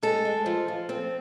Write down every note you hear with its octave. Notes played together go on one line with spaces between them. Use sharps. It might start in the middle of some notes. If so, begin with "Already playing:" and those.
G#3 A4
G#3
F3
F3
C4